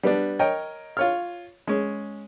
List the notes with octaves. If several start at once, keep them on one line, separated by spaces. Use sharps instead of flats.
G3 B3 D4
A#4 C#5 D#5 G5
F4 C#5 F6
G#3 C#4